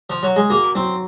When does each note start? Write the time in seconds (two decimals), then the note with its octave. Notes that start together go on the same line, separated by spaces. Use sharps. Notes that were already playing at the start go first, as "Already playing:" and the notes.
0.10 F3
0.23 F#3
0.36 G#3
0.50 A#3 F#4
0.75 F#3 C4